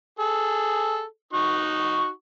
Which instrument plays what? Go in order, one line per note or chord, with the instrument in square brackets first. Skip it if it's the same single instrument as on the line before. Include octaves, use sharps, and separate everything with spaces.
[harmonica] G#4 A4
D#4 F#4 C#6